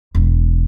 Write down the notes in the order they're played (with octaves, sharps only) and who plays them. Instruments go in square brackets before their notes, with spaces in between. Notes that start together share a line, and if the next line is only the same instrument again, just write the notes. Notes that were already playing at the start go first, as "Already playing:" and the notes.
[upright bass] E1